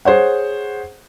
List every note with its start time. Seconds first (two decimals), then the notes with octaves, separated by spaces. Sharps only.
0.05 G#4 C5 C#5 F#5